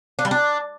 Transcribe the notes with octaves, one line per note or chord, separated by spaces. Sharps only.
D4
G3
D4